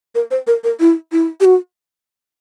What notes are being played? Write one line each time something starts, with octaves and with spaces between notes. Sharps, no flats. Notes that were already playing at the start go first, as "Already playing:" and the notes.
A#4
C5
A#4
A#4
E4
E4
G4
F#4